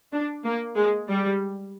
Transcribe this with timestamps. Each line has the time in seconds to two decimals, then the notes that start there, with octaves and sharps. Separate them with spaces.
0.12 D4
0.45 A#3
0.77 G#3
1.08 G3